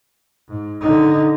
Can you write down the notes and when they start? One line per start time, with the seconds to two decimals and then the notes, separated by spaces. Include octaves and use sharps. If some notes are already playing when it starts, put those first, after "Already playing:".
0.49 G#2
0.81 D3 D#4